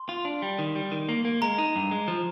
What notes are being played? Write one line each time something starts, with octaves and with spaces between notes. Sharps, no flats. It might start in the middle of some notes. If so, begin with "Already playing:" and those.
Already playing: C6
F4
D4
G3
D#3
G3
D#3
A#3
A#3
G#3 A#5
D#4
G2
G#3
F3